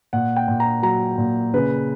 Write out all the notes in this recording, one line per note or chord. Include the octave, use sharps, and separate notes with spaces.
A#2 F#5
G5
A#2
A#5
F#3 A#5
A#2
C#3 B4